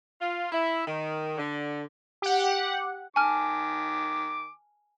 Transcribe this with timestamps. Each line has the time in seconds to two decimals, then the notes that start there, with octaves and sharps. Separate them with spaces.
0.21 F4
0.52 E4
0.87 D#3
1.38 D3
2.22 G4 F#5
3.16 D#3 G#5 A5 D6 F6